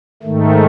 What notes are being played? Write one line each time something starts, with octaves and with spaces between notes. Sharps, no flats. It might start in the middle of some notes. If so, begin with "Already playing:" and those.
G#2 D#3 A3